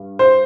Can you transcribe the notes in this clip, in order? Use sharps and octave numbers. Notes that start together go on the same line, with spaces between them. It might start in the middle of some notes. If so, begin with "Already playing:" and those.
Already playing: G2
C5